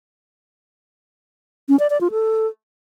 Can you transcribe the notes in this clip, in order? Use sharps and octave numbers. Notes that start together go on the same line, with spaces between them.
C#4
D5
D5
F4
A4